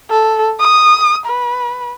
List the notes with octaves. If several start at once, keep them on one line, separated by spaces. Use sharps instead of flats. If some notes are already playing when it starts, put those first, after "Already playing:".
A4
D#6
B4